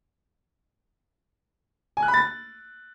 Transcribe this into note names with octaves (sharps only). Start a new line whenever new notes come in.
G#5
F#6
B5
A6